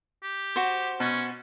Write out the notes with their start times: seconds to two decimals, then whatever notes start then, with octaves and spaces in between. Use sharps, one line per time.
0.23 G4
0.56 F#4 C5
1.00 B2 C#4